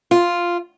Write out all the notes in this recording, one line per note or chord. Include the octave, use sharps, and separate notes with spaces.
F4